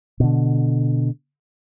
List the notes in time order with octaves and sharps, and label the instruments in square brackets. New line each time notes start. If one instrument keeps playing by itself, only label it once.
[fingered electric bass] B2 D3